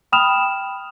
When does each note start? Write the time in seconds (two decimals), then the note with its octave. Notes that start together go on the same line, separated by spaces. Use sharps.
0.12 G5 B5 D#6 F6 E7 F7